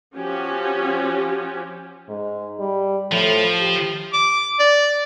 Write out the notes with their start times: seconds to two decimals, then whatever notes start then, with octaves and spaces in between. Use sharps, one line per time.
0.16 F3 C#4 F#4 G4
2.09 G#2
2.59 G3
3.11 A2 F3
3.60 G4
4.13 D6
4.59 D5